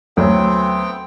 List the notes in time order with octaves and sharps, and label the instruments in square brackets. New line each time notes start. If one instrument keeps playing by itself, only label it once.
[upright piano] D2 F#3 [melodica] B3 C4 G5